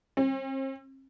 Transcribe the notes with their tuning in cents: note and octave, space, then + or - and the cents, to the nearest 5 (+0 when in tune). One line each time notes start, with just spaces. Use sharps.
C4 +40